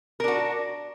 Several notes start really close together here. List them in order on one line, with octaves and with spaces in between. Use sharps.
A#4 D4 F#4